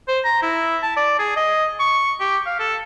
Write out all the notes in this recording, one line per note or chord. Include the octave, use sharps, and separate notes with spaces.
C5
A#5
E4
A5
D5
G#4
D#5
C#6
G4
F5
A4